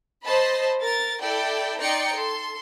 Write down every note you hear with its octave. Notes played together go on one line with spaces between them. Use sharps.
C5 D#5 A5 B5
A#4 A6
E4 A4 D5 G5
D#4 D5 G5 A#5 C6 C#7
A4 C6